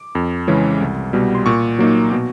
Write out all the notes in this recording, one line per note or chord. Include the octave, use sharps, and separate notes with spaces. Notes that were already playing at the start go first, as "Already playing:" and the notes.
Already playing: D6
F2
C#3 E3 G#3 C#4
C2
B2 G3
C6
A#2 C#6
F#3 A#3 D#4
B2